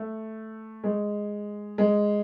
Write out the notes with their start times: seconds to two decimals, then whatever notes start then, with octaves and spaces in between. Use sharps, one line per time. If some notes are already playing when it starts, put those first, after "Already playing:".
Already playing: A3
0.84 G#3
1.78 G#3